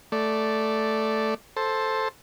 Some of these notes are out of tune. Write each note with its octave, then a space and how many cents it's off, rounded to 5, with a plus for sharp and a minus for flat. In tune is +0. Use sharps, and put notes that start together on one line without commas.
A3 +0 D5 +0
A4 +0 C5 +10